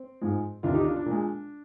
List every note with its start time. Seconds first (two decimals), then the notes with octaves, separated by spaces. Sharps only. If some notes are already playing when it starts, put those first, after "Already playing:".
Already playing: C4
0.21 G#2 F3 G#3
0.63 D2 C3 D#3 D4 F4
0.74 D#4 G4
0.84 D4 F4
0.96 D4
1.06 A#2 F3 G#3